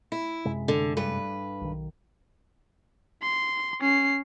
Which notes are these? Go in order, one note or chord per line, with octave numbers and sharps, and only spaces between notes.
E4
F#2 C3 G#3
D3
G2 B4
B1 D#3
C6
C#4 C7